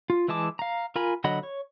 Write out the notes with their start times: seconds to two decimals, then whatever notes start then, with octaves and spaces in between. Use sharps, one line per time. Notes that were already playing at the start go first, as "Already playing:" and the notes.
0.10 F4
0.28 E3 G#3 E4 A5 D6
0.59 F5 A#5
0.96 F4 A#4 G#5 B5
1.24 D3 F#3 D#5 F#5 B5
1.43 C#5